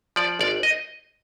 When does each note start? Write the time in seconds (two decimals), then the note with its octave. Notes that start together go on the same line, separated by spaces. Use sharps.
0.16 F3 D5
0.39 G#1 D5
0.63 D#5